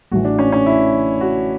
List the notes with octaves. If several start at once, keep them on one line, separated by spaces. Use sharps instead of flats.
A1 A2 E3 F#4
D4
C#4
C#4
E4
F#4